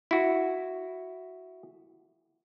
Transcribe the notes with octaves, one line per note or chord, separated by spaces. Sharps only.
E4 F#4